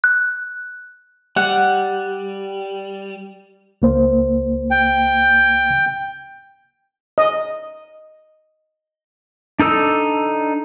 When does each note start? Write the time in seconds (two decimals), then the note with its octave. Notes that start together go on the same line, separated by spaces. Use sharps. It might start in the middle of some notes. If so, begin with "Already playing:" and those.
0.04 F#6
1.36 G3 F#5
3.82 C#2 A#3 C5
4.71 G5
7.18 D#5
9.59 D4 D#4 A4 E6